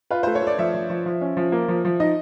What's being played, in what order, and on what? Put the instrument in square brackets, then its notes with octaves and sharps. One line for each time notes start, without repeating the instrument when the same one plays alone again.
[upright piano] F4 [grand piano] B4
[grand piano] C5
[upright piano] A3
[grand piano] C#5
[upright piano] A3 [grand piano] D5
[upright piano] F3 [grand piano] E5
[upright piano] F3
F3
F3
C#4
F3
A#3
F3
F3
[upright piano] D#4 [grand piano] D#5